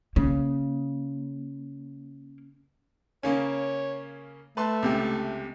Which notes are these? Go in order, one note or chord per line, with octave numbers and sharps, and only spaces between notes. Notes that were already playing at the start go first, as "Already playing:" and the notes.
C#3 A#3
C#3 A#3 C#4 C#5
A3 B4 A5 C6
C#2 C3 G4